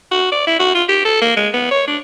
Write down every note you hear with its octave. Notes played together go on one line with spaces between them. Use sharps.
F#4
D5
E4
F#4
F4
G4
A4
A#3
G#3
B3
C#5
D4